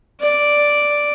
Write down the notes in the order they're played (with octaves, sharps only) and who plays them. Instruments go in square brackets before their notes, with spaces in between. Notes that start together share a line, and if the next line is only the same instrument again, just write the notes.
[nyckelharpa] D5